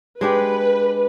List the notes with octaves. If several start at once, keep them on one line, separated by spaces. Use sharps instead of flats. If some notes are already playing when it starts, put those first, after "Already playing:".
G#3 D4 G4 B4